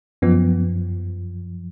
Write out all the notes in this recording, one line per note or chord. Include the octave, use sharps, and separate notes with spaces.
F#2 F3 B3